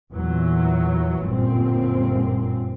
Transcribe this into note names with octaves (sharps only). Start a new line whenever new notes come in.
E2 A#2 E3 F#3
G1 F#2 A#2 C4